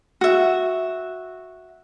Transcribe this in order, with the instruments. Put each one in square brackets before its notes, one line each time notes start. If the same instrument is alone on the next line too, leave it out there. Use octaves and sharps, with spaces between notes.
[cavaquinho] F#4 E5